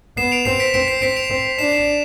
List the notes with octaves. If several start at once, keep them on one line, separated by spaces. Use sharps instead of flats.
B3 C7 E7
D7 F7
C4 C7 E7
B6 D7
C4 B6 D7
C7
C4 B6 D7
D7 F7
C4
D4 C7 E7
C7 E7